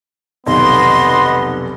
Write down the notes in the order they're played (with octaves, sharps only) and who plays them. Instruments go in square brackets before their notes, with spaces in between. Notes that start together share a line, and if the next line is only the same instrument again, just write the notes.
[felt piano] F1 B1 D#3 [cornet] B3 [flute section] D#5 C6